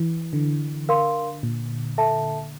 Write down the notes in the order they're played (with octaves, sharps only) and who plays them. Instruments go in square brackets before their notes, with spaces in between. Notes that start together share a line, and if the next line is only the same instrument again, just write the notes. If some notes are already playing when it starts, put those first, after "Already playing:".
Already playing: [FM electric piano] E3
D3
[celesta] A#4 F5 C6
[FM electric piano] A#2
[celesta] A4 E5 A5